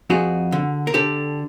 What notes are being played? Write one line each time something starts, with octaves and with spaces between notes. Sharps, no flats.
F2 F#4 G#4
D3
A#4
D3 G4 A4